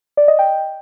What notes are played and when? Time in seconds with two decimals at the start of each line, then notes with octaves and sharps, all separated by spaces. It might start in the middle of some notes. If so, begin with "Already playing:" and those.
0.17 D5
0.28 D#5
0.39 G5